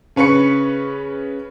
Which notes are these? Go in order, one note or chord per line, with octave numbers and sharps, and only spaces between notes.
C#3 C#4 B4 C#6 C#7